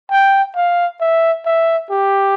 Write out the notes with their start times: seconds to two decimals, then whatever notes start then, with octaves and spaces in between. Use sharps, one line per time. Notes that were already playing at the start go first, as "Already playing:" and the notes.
0.11 G5
0.56 F5
1.01 E5
1.46 E5
1.90 G4